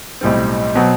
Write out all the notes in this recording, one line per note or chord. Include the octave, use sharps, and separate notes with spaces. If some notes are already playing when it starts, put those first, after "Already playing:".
B1 A2 G3 C4
B2 F#3 C4